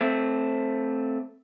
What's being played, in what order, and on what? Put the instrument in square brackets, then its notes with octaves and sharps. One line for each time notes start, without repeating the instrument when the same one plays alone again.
[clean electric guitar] A3 C4